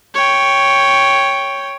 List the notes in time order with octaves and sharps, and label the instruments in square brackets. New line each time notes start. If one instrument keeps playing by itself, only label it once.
[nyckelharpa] C#5 G5